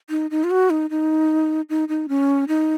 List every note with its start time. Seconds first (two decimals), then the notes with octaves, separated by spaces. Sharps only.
0.10 D#4
0.31 D#4
0.44 F4
0.51 F#4
0.70 D#4
0.90 D#4
1.69 D#4
1.89 D#4
2.09 C#4
2.48 D#4